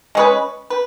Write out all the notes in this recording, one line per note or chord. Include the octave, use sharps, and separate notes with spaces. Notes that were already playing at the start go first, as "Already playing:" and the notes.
G#3 C#4 G#4 B4
B4